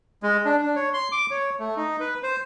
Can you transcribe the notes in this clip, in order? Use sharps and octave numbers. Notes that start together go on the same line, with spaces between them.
G#3
D4
D4
C#5
C6
D6
C#5
A3
D#4
B4
C5